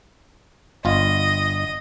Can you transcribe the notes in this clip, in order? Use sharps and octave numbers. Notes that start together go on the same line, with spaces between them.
G1 F4 D#5